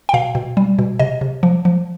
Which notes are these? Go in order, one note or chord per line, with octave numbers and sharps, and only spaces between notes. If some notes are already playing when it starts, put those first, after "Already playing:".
G5
B2 F5
B2
G3
B2
C3 D#5
C3
F3
F3